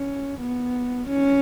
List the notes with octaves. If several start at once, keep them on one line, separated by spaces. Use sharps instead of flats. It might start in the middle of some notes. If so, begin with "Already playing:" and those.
Already playing: C#4
B3
C#4